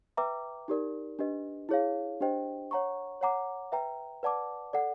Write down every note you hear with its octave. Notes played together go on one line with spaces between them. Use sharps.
B4 E5 G5 A#5 D6
D#4 G4 A#4 D5
D4 G4 B4 D#5
E4 G#4 C#5 F5
D4 G4 C5 D#5 G5
C#5 F#5 A#5 C#6
C#5 F#5 A#5 D6
B4 E5 G5 A#5
B4 D5 F#5 A5 D6
A4 D5 F#5